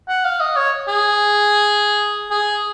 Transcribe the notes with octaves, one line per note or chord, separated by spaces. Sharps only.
F#5
F5
D#5
C#5
G#4
G#4